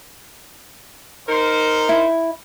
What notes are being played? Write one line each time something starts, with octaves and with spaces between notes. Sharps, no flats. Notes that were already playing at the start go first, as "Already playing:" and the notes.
D#4 A#4 C5
E4